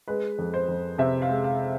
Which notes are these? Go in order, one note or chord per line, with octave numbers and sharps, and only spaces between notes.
G#3 B4
F2
C5
F2
C3 E5
F5
G#3
F5